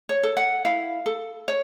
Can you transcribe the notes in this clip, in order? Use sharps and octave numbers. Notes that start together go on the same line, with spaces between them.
C#5
A4
F#5
E4 F5
A4
C#5